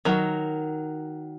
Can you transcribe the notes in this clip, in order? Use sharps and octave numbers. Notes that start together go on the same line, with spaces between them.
D#3 F#3